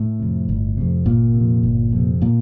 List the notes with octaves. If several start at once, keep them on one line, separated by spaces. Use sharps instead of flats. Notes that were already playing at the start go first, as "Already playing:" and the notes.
Already playing: A2 A3
F2 C3
G1
F2 C3
G1 A#2 A#3
C3
F2
G1
F2 C3
A#2 A#3